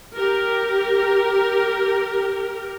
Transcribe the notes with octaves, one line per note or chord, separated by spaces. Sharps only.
G4 A#4